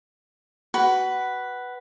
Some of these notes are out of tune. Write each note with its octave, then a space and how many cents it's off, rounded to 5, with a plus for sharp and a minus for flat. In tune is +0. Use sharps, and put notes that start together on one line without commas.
F#4 +20 B4 +0